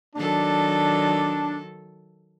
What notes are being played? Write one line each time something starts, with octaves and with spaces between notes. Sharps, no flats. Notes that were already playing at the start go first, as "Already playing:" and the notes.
D#3 F#3 D4 A4